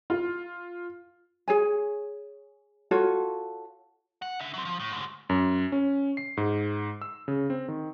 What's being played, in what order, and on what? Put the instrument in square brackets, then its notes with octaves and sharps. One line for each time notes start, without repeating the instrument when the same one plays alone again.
[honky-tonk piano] F4
[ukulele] G#4 C#5 G#5
F4 F#4 A4 C#5
[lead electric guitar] F#5
D4 E5
F#3 C4
F3
A2
D2 G#2
[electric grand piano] F#2
C#4
C7
G#2
E6
C#3
C4
D#3